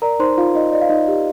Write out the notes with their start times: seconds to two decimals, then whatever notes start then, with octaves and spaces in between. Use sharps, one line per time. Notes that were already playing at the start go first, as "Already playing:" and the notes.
0.02 A#4 D5 A#5
0.20 D#4 C5 C6
0.38 D#4 F4 F5
0.55 D#4 D#5
0.72 D5 D#5
0.82 F5
0.89 D#4 D#5
1.08 G4